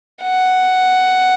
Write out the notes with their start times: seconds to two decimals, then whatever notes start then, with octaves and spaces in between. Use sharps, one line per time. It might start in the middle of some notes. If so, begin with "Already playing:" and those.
0.23 F#5